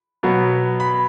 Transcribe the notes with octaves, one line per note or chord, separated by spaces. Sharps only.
B2 F#3 B3
B5